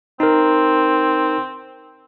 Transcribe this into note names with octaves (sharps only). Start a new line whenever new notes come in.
C4 D#4 A#4